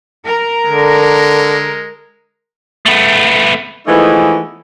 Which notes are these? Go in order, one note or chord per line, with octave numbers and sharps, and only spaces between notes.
A#4
D3 G#3
A3 B3
E3 F3 G#3 A3 B3 D#4